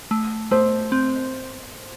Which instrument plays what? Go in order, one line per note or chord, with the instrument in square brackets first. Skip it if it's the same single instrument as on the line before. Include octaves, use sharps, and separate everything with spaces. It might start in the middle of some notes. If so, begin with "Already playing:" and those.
[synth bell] A3
[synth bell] A3 [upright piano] C5
[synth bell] C4